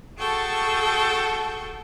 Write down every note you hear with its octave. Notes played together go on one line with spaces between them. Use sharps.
F#4 G#4 A4 G5 A5 C#6